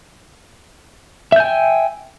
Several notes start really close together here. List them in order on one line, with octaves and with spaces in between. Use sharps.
E5 G6 G#5 G5